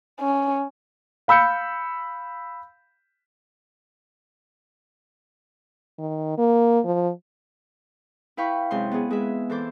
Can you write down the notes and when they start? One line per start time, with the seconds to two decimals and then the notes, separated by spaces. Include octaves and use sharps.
0.21 C#4
1.28 F5 B5 E6 G6 C#7
5.99 D#3
6.38 A#3
6.85 F3
8.37 E4 B4 F5 G5 B5 C#6
8.71 F#2 C3 G#3 C6
8.91 B3 F4 G#4
9.10 G#3 G#4 B4 E5
9.50 E3 A4 C5 D6